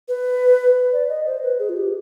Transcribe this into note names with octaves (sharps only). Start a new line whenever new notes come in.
B4
D5
D#5
C5
B4
G#4
F4
G4